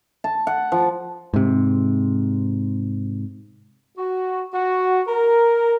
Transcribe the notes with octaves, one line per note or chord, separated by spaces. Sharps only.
A5
F#5
F3
G#2 C3
F#4
F#4
A#4